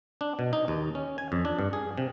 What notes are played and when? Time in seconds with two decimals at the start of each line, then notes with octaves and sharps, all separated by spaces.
0.21 D4
0.39 B2
0.53 D#4
0.68 D#2
0.95 C#4
1.18 G#5
1.32 F2
1.45 D4
1.59 G2
1.73 G#4
1.98 C3